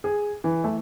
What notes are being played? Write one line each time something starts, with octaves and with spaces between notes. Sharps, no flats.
G#4
E3
A3